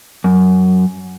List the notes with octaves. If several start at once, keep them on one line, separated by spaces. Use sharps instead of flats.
F#2